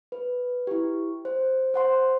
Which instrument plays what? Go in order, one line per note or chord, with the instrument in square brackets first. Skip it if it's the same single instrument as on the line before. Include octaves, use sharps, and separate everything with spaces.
[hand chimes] B4
E4 G4
C5
C5 F#5 C6